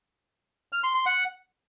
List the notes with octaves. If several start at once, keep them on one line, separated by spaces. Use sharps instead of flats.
F6
C6
C6
F#5